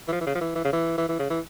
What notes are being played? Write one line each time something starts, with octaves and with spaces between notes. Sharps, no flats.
E3
F3
E3
C#3
F3
E3
E3
C#3
E3
E3
E3
C#3
E3